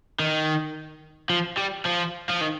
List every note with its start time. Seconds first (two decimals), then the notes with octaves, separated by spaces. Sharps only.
0.20 D#3
1.30 F3
1.57 G3
1.85 F3
2.29 F3
2.41 D#3